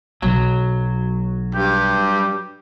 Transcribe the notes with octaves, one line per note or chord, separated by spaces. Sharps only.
B1 F#3
G2 G4